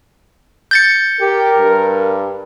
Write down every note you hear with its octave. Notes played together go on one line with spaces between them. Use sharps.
G6 A6 C#7
G4 A#4
G2